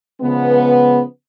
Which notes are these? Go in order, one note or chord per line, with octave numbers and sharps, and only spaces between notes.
C#3 F3 G#3 B3